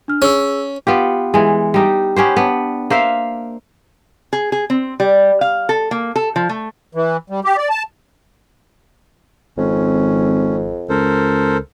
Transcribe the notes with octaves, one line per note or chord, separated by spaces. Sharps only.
D4 F6
C#4 G#4 E6
B3 F4 G4
E3 G#3
G3 D#4 G4
B3 C#4 G4 C5
B3 D4
A#3 C5 E5 F5
G#4
G#4
C4
G3
F5
A4
A#3
A4
F3
A3
E3
G3
G4
D5
A5
G#1 F2 C#4
C#2 A4 A#4 C5